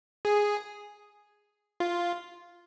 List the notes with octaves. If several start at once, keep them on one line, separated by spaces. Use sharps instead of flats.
G#4
F4